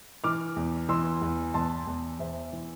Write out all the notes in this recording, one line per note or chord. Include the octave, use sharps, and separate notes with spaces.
E3 D6 F6
E2
E3 C6 E6
E2
E2 A5 C6
E2
E2 C5 E5
E3